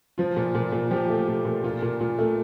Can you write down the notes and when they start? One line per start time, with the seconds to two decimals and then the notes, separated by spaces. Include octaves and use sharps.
0.18 F3 F4
0.36 A#2
0.55 A#2
0.72 A#2
0.91 F3 G4
1.10 A3
1.28 A#2
1.45 A#2
1.64 A#2 F4
1.82 A#2
2.00 A#2
2.18 A3